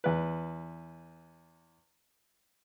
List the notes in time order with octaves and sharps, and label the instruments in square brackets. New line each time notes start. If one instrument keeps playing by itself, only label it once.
[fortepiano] E2 B4